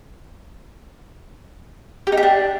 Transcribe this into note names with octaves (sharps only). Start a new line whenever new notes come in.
G4
D#4
G4
D4